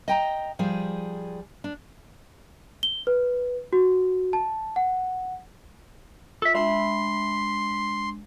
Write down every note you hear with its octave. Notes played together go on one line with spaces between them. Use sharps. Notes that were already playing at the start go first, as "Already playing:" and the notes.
D#5 G5 A#5
F3 G3 G#4
D4
G7
B4
F#4
A5
F#5
F4 A4 E5
G#3 D4 E5 B5 C6